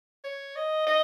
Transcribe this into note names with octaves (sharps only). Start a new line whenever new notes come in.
C#5
D#5
D#5